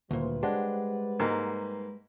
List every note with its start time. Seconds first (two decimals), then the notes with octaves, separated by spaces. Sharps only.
0.11 D2 A#2 D#3 G3 A#3 B4 C5
0.43 G#3 D4 G4 C5 F#5
1.19 G#2 A#3